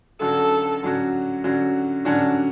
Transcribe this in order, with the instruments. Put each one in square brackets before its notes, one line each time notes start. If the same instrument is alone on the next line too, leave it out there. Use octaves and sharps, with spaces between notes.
[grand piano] D3 F#3 C#4 F#4 [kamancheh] A4
[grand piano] D3 F#3 C#4 F#4
D3 F#3 C#4 F#4
[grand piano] D3 F#3 C#4 F#4 [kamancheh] D4